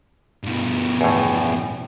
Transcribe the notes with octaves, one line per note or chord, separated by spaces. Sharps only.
G2 B2
E2 A2